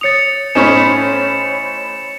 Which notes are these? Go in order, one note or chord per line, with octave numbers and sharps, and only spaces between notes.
C#5 D#6 A6 C#7 F7
A2 C#4 D#4 C5 C#5 G#5 B5 E7